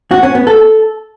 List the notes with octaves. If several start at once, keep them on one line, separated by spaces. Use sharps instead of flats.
F#4
C#4
B3
A4